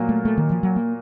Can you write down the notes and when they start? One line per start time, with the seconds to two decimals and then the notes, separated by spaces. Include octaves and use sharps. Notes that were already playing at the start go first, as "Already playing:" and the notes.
Already playing: A#2 F#3 A#3
0.09 A3
0.25 A3
0.37 D#3
0.50 F3
0.63 F#3
0.76 A#3